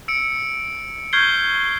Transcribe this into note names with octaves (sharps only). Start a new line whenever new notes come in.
E6 C#7 D7
C#6 F6 G6 G#6 C7 G7